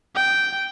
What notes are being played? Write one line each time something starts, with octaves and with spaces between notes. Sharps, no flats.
G5